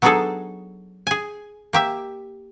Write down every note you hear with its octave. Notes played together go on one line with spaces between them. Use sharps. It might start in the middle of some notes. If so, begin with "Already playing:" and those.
F#3 B3 D4 D#4 G#4 A4
G#4 G#5
A#3 G4 E5